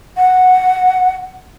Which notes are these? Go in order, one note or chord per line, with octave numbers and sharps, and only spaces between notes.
F#5